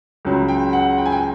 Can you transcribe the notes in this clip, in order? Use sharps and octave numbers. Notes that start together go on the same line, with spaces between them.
C#2 C#3 F#3
G5
F#5
G5
G#5
G5